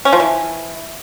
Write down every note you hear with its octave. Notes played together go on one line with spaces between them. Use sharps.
C#4
F3
E3